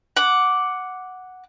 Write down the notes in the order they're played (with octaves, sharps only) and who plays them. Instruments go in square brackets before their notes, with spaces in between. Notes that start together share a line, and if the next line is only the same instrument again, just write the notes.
[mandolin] F#5 D6